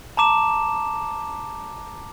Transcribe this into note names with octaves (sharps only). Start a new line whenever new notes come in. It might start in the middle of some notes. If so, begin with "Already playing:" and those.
A5 A#5 D6 E7